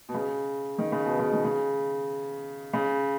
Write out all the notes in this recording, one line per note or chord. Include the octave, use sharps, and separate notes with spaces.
B2
C#3
D#3
C#3
B2
C#3
D#3
C#3
C#3